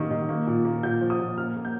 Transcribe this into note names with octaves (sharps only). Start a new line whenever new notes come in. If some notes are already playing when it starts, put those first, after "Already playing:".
Already playing: D#3 G3 A#3
D#3
A#3
A#2
A#3
A#2 G6
F3
D#6
A#2
A#3 F6
A#3
G6